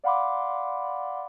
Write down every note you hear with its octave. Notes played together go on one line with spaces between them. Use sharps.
D5 F5 F#5 B5 C6 D6